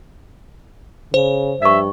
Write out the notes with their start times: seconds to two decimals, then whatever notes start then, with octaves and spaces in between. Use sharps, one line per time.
1.14 C#3 C5
1.62 G2 D#5 E5 C#6